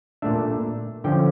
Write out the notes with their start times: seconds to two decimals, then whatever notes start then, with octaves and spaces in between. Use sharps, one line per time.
0.22 A#2 A3 D4 E5
1.04 D3 F3 C#4 G5